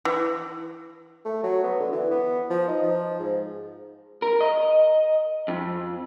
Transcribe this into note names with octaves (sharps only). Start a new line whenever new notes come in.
E3
A3
F#3
B3
D3
E3
B3
F3
D#4
F3
G#2
A#4
D#5
F2